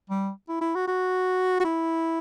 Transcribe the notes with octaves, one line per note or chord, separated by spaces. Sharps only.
G3
E4
E4
F#4
F#4
F#4
E4